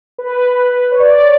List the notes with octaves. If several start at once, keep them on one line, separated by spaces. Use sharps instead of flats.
B4
C#5
D5
C#5